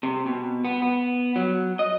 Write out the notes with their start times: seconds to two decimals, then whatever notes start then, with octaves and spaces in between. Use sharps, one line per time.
0.03 C3
0.26 B2
0.65 B3
0.82 B3
1.36 F#3
1.79 D#5